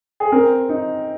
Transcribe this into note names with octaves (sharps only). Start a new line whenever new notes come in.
G#4
C4 A#4
D#4